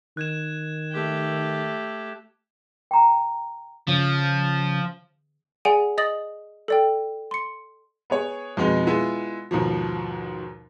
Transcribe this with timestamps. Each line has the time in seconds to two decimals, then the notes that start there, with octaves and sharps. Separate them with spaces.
0.17 D#3 F#6 G#6 E7
0.91 A3 G4
2.91 G5 A#5
3.88 C#3 F3
5.65 G#4 D5 F#5 G#5 D7
5.98 D#5 D#6 A6 F#7
6.68 A4 D5 G5
7.31 C6 C#7
8.10 B3 G#4 C#5
8.57 F2 B2 G#3 B3 D#4
8.87 G#3 B3 E4 F4
9.51 D#2 G#2 B2 F3